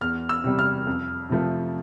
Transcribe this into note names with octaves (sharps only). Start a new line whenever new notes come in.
E2 F6
E6
C3 G3
F6
F2
C3 F3 A3